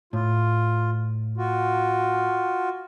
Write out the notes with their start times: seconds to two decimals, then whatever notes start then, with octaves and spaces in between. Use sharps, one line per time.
0.13 A2 F4
1.37 F4 F#4